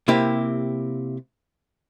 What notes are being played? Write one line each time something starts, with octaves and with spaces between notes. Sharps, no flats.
C3 A#3 E4 G4